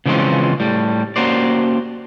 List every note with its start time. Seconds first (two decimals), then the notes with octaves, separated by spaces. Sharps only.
0.06 C#3 E3 F3 G#3 C4 C#4
0.60 A2 G3
1.16 A#3 C#4 F#4 G4 C5 D5